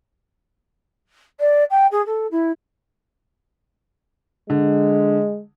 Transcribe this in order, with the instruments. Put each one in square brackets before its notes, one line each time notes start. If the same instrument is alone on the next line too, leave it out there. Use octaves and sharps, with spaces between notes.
[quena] D5
G5
G#4
A4
E4
[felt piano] D3 [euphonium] G#3